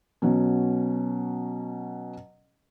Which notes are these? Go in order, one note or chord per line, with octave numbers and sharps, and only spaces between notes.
B2 F#3 C#4